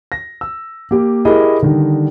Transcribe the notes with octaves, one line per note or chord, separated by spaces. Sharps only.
A#6
E6
A#3 G4
E4 G4 G#4 A#4 D#5
D3 D#3 G3